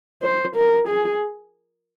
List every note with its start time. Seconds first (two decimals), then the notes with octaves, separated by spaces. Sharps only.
0.23 C5
0.56 A#4
0.88 G#4